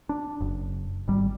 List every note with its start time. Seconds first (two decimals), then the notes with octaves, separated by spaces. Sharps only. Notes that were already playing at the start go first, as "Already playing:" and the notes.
0.09 D4
0.41 F#1
1.08 G#1 G3